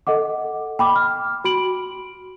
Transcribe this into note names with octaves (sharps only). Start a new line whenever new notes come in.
A4 D#5 F#5 D6
G5 B5 D6
F6
F#4 B5 D7 F#7